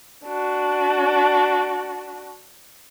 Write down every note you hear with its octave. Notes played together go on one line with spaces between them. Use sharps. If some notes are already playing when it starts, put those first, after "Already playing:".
D4 F#4